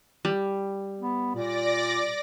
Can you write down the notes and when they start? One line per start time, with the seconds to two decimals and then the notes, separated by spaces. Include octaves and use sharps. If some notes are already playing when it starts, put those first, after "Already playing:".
0.25 G3
0.99 B3
1.35 A#2 D5 D6 A#6